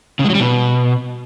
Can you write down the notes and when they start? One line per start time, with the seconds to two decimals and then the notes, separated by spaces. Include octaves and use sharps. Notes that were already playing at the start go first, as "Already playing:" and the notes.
0.19 C#3
0.24 G#3
0.30 F#3
0.35 G3
0.40 B2